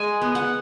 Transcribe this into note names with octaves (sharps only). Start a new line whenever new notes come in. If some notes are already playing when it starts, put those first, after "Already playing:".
Already playing: G#3 G#5
B3
F#5